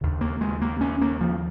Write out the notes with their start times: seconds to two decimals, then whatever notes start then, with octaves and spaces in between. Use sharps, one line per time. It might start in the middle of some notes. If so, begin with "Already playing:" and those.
0.01 D#2 C#3
0.21 A#3
0.41 G#3
0.62 A#3
0.81 C#4
1.02 A#3
1.21 F3